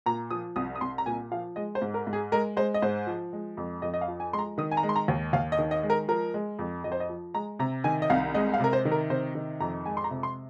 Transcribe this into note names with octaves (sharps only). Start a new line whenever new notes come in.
A#2 A#5
F3 D#6
C2 D#6
D#6
C2 C6
A#5
A#2 G#5
F3 F5
G#3 D#5
C5
G#2
A#4
G#2
G#4
G#3 A#4
G#3 C5
D#5
G#2 C5
F3
G#3
F2
F2 D#5
D#5
F5
F3
G#5
G#3 C6
A#5
D#3 D#6
G#5
A#5
G#3
C6
A#5
D#2
D#2 F5
D#5
D#3
D#5
G#3
A#4
F3 A#4
G#3
F2
F2 D#5
C5
D#5
F3
G#3 A#5
C3 A#5
D#3 G#5
D#5
C2 F5
G#3 D#5
F5
C3 A#4
C5
D#3
A#4
C3 C5
D#3
F2 A#5
G#3 G#5
C6
A#5
C3
C6